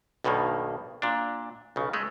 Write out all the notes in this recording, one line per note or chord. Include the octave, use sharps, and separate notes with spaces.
B1 G2 B2 D#3 A#3
A#2 D4
B1 C#3
G#3 A3